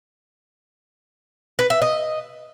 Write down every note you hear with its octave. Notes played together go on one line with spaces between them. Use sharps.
B4
E5
D#5